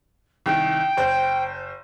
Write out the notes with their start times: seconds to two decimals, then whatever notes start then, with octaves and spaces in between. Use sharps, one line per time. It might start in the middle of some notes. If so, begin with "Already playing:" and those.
0.46 C2 D#3 G5
0.97 F#1 C5